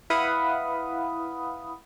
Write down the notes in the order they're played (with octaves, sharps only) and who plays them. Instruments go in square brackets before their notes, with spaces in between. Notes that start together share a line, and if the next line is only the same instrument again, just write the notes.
[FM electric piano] E4 B4 F5 F#5 B5 D#6